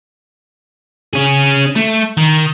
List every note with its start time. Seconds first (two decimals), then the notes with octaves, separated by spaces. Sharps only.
1.14 C#4 G#4
1.76 A3
2.17 D#3